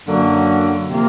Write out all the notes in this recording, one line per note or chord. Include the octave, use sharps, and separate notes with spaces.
F#2 D3 F#3 A#3
C3 F3 A#3